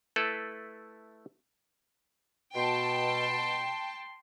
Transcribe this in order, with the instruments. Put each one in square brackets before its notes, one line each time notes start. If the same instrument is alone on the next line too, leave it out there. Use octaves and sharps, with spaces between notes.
[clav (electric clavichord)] A3 E4 A4 B4
[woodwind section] B2 [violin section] G5 A5 [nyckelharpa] C6